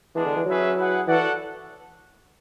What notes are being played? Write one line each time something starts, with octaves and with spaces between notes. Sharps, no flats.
E3 G#3 B3 D4
D3
E3
F#3 C#4 G#4 B4 E5
E4 G#4 B4 F#5
E3 F#4 A4 D5 F#5